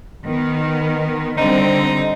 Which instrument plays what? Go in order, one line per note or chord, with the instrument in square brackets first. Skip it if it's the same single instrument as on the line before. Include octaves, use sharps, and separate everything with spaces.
[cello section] D#3 B3
[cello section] D3 G3 C4 [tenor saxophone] D#4